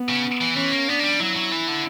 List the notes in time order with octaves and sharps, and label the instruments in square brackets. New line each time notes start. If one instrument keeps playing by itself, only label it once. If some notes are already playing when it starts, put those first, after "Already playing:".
Already playing: [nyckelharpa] B3
[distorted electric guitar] C#3
E3
[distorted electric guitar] E3 [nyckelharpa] C#4
[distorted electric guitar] A#3
[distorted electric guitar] B3 [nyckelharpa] D4
[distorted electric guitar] A#3
G3
[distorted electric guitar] F#3 [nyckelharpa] E4
[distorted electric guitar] F#3
E3
D3